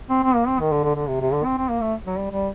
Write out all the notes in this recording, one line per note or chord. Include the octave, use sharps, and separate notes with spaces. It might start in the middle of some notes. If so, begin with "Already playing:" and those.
C4
C4
A#3
C4
D#3
D3
D3
D3
C3
C3
D3
C4
C4
A#3
A3
F#3
G3
G3